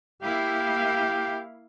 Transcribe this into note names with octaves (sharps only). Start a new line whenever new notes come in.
A#3 E4 G4 F5